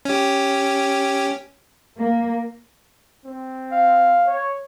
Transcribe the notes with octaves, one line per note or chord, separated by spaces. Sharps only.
C#4 G4
A#3
C4
F5
C#5